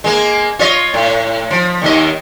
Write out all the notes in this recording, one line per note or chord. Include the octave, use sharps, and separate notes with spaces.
G#3 A#3
F4 C#5 D#5
A2
F3
D#2 D#3 D#5